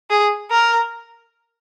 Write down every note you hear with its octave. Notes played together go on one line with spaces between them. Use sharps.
G#4
A#4